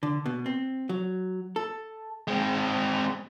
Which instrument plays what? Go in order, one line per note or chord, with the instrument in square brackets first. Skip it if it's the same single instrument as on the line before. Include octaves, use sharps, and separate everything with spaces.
[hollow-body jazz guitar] D3
B2
C4
F#3
A4
[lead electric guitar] G#3 C4